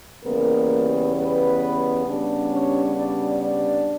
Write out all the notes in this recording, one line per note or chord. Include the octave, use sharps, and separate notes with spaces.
E2 C#3 G3 A#3 B3 A#4
B3 B4
C#3 G3 B3 D4
C#4 C#5
D4 D5
D4 D5